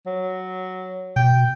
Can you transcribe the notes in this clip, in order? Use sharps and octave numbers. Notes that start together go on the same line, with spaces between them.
F#3
B2 G5